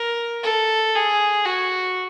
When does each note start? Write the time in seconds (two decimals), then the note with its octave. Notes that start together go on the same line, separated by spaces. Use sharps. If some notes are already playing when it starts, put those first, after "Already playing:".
Already playing: A#4
0.43 A4
0.95 G#4
1.45 F#4